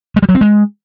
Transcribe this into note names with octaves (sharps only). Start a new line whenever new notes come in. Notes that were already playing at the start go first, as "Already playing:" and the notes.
G#3
G3
F#3
C4
G#3